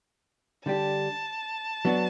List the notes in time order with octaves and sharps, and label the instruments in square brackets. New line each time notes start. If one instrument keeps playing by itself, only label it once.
[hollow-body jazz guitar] D3 G3 D4 G4 [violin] A5
[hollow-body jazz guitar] F#3 B3 D4